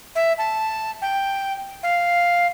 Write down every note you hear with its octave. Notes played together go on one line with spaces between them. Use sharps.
E5
A5
G5
F5